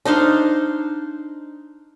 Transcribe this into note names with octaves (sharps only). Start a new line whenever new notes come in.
D4 D#4 C5 F5